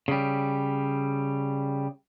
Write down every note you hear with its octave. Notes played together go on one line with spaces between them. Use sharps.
C#3 G3